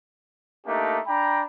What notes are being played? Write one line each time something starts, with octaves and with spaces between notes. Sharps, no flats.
A3 A#3 D4 D#4 G4
D4 G5 A#5 B5